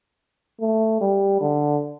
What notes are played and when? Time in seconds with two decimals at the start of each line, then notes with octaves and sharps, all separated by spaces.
0.61 A3
1.01 G3
1.41 D3